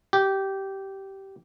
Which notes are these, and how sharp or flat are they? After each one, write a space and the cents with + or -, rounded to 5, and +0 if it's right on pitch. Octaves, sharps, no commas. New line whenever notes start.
G4 -15